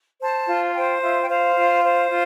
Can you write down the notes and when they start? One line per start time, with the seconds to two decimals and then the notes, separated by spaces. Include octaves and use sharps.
0.20 C5 A5
0.48 F4
0.75 C5 G5
1.01 F4 E5
1.23 G5
1.29 C5 F5
1.56 F4
1.83 C5
2.10 F4